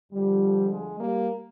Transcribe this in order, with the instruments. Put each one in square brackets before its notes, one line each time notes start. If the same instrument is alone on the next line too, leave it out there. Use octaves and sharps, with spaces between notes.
[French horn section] F2 D3 F3 G3
G#3
G3 A#3